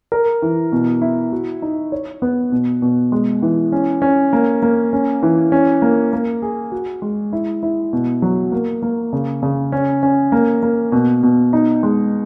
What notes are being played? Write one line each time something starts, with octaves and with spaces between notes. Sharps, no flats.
A#4
E3
B2
E4
F#4
D#4
C#5
B3
B2
B2
G#3
E3
C#4
C#4
A#3
A#3
C#4
E3
C#4
A#3
A#3
G#4
F#4
G#3
E4
E4
B2
F#3
A#3
A#3
C#3
C#3
C#4
C#4
A#3
A#3
B2
B2
D#4
G#3